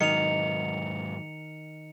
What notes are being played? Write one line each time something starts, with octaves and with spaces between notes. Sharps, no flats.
G#2 D#3 F#3 C#7 F7